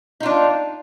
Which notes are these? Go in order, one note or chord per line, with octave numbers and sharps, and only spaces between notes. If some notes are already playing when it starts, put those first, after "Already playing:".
D4 D#4 F4